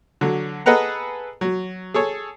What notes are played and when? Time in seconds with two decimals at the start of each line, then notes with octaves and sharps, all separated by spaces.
0.21 D3 F#3
0.66 G#4 A4 B4 D#5 F#5 A#5
1.41 F#3
1.94 G#4 A4 C#5